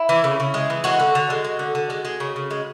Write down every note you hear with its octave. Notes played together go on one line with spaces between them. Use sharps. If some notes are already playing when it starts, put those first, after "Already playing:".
Already playing: E4
E3
C#3
C#3
G#3
E3
G#3 F#4
D3
D3
G#3
G#3
D3
D3
G#3
G#3
C#3
C#3
G#3